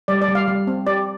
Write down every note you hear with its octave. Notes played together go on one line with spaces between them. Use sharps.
G3 D5
D5
G3
F5
G3
C4
G4 D5